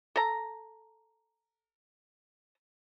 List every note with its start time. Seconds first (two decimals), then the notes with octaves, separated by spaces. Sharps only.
0.16 A4 A#5